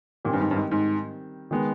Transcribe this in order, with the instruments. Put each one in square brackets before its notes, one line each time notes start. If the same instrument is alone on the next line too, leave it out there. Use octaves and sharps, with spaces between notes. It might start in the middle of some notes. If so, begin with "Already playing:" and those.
[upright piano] A#2 [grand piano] D#3 G3 C4
[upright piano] G2
G#2
G2
G#2
G#2
[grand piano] D#3 G#3 B3